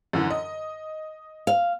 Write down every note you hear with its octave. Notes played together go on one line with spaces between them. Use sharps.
F#2 D3 E3
D#5
F5